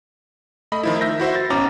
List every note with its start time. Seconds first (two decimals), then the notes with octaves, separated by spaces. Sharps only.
0.72 A3 D#5 B5
0.83 D#3 F3 E4
1.01 E5 G6 A#6
1.20 E4 F#4 C5 E5
1.36 A6
1.50 G#1 B2 C#4 A#5 D6